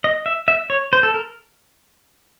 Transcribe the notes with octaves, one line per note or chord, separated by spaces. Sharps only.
D#5
E5
E5
C#5
C5
A4
A#4